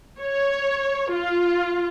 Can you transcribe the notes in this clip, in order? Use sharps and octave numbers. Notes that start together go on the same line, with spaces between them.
C#5
F4